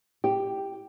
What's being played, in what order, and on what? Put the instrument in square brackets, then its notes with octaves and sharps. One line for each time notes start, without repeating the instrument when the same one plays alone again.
[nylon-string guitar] G4